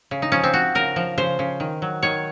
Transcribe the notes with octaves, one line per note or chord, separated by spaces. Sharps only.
C#3
D#4
F3 C#4
C4
F3 F#4
C#3 A#4
F3
C#3 C5
C#3
D#3
F#3
D#3 C#5